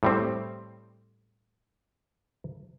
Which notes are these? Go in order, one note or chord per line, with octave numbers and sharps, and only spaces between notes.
A2 G3 C4